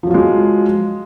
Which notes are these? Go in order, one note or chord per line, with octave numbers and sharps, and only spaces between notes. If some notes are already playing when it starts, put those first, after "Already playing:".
F3 F#3 G#3 F4 F#4